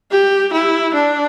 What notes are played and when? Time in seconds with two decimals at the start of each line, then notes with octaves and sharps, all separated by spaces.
0.11 G4
0.53 E4
0.94 D4